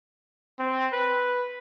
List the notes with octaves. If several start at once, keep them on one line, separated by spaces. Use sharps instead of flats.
C4
B4